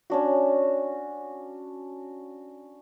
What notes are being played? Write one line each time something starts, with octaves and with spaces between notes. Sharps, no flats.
C#4 D4 F#4